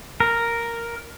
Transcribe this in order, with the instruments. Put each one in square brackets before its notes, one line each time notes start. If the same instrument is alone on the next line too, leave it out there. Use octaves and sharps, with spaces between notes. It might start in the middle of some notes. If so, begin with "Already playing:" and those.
[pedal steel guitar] A#4